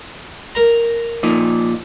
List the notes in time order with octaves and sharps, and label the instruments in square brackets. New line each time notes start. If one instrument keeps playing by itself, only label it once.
[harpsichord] A#4 A#5
[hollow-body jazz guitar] A#2 F3 D#4